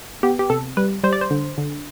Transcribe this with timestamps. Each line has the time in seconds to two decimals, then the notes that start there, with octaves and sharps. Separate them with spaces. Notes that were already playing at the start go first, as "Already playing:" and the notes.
0.23 B3 G4
0.39 G4
0.50 C3 A4
0.77 G3 B4
1.04 G3 C5
1.13 D5
1.21 C5
1.31 D3
1.58 D3